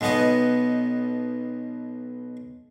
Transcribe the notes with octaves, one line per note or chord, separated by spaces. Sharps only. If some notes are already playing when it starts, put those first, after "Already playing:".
B1 B2 B3 F#4 D#5